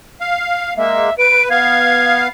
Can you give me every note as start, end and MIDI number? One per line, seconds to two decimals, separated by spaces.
0.20 0.74 77
0.77 1.10 56
0.77 1.10 58
0.77 1.16 76
1.18 1.49 71
1.18 1.43 98
1.50 2.28 59
1.50 2.28 77
1.50 2.21 92